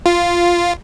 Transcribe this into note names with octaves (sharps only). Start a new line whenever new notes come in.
F4